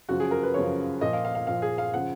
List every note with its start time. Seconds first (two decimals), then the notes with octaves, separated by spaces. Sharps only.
0.09 F#2 C#3 F3 F#4
0.20 G#4
0.31 A#4
0.43 B4
0.54 F#2 C#3 F3 C#5
1.01 A#2 F3 D#5
1.13 F5
1.25 F5
1.35 F5
1.47 A#2 F3 F5
1.62 G#4
1.78 F5
1.93 C#3 F3 F#5